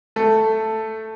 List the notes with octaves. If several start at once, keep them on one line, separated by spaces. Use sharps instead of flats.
A3 A4